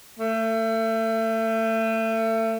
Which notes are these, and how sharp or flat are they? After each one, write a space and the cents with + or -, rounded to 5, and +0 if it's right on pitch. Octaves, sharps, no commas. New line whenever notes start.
A3 +30